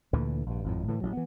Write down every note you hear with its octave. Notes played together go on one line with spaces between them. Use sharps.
D2 A#2 D3 E3
A#1 G2
G#1 F2 A2
A2 D3 E3
A1 F#3
E3 B3